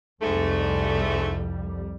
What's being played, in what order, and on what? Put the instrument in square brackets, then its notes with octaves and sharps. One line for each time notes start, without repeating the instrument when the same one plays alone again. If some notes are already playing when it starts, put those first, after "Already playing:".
[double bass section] C2 F2 G3 [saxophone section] G#2 A3